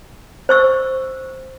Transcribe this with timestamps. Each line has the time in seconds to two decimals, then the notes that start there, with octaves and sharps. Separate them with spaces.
0.49 C5 C#6 E6